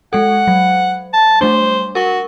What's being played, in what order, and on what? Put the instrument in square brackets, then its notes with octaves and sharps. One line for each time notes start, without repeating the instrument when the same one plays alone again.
[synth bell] G#3 A4 [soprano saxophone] F#5
[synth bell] F#3
[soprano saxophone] A5
[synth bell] G3 A3 D4 [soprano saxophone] C5
[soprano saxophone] F#4 [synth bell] A#4 C#6